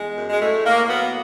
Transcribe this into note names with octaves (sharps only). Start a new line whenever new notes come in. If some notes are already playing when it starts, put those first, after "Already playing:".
Already playing: E2 G#3
F#2
G#3
A2 A3
A2 A#3
A#3
F#3 B3